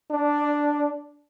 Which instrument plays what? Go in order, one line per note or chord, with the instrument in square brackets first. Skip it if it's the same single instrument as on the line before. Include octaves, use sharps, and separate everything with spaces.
[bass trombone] D4